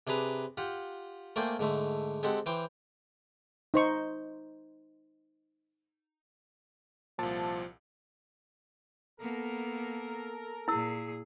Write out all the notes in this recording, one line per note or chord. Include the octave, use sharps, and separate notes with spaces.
C3 D4 G#4 B4 A#5
F4 G4 F#5
A3 A#3 C5 D5 G5 G#5
G#2 D3 A3
G#3 C4 G4 A4 F#5
E3 C5 G5 D6
D#4 C5 C#6
C2 A#2 F3 A5
A#3 B3 A4 A#4
A#2 E4 G#4 E6